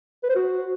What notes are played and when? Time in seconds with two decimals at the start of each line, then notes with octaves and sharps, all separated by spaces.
0.23 B4
0.29 C5
0.36 F#4